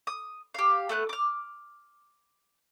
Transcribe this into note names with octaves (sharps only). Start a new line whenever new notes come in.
D#6
G4 F5
A3 B3 F#5 F#6
D6 F6